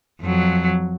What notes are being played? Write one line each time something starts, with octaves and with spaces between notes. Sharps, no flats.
F2 F#3